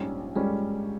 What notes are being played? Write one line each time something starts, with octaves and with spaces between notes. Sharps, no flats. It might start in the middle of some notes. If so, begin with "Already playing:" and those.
Already playing: A#1 G#2 G3 C#4
G3 G#3 C#4